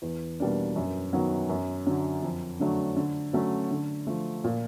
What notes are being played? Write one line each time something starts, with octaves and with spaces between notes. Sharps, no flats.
E2
B2 G3 A#3 D4
F#2
D#3 F#3 B3
F#2
D3 F#3
F2
D3 F#3 A3 D4
D3
F#3 A3 C#4 F#4
D3
F3 A3
A#2